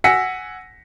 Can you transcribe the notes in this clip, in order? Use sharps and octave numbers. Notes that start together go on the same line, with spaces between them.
F#5 G#5 E6 A#6 B6 C#7